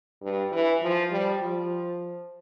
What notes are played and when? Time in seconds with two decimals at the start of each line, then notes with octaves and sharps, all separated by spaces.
0.22 G2
0.52 E3
0.82 F3
1.11 G3
1.40 F3